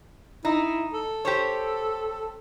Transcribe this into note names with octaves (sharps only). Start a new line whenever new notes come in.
D#4 E4
A4
G4 C5 C#5